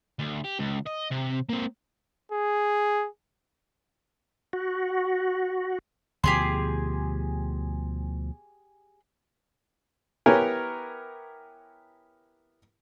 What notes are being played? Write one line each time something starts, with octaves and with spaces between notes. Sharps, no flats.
D2
G4
C#2
D#5
C3
A#3 C4
G#4
F#4
D2 B2 F3 G4 G#4 C6
B3 E4 G4 A#4 C#5 G#5